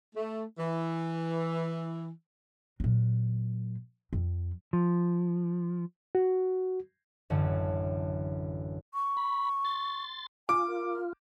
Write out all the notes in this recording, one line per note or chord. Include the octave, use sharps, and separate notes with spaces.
A3
E3
A#2 F#3
F2
F3
F#4
A1 F#2 D3
C#6
B5
C6 A6
F4 G#5 D6
A#4